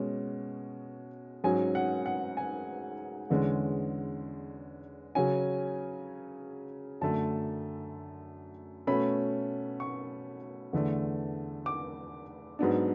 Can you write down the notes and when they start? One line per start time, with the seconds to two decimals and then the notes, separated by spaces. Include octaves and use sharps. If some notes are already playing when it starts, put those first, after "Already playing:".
Already playing: B2 G#3 C#4
1.44 G#2 F#3 C#4 G#5
1.75 F#5
2.06 F#5
2.37 G#5
3.30 E2 D3 G#3 C#4
5.15 C#3 F#3 C#4 G#5
7.01 F#2 D3 A3 A5
8.87 B2 A3 C#4 B5
9.80 C#6
10.73 E2 D3 A3 D4
11.66 D6
12.59 G#2 F#3 B3 D4